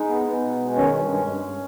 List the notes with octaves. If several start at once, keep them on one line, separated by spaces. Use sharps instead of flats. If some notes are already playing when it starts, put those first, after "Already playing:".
Already playing: G#3 D#4
B3
B3
B2
G#3
D#3 C#4
G2
G#3
G2